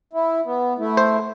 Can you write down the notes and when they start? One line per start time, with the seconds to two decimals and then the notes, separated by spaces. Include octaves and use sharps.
0.13 E4
0.45 B3
0.79 A3 E4
0.97 C5